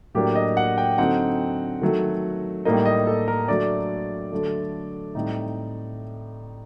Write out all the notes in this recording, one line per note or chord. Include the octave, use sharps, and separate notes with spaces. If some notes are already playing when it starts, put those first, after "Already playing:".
A2 F#3 A#3 D4 G4
D#5
F#5
G5
D3 F#3 C4 D#4 F#5
D#3 F#3 A3
A2 G3 A#3 D#4 D#5
D#5
A4
A#4
F#3 A3 D4 D5
D3 F#3 A3
A2 G3 C4 D#4